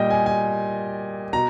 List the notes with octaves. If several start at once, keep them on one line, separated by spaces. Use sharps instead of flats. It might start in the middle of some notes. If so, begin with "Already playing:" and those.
Already playing: A#2 G3 D#5 G5
G#5
G#5
B2 A#5